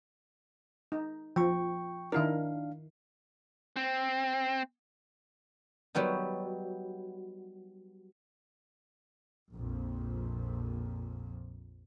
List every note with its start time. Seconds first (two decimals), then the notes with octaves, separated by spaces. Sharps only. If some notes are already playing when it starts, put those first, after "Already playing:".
0.92 D#4
1.36 F3 G5 C#6
2.12 D#3 D4 E4 A#4 F5
3.76 C4
5.95 F#3 G3 B3 D#4
9.53 A#1 F2 A#2